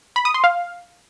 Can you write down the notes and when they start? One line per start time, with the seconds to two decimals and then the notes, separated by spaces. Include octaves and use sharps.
0.16 B5
0.25 D#6
0.34 C6
0.44 F5